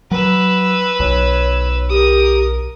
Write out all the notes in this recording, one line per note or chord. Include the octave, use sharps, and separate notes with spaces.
F#3 B4 E6
B1 C#5
G4 A#4 D#6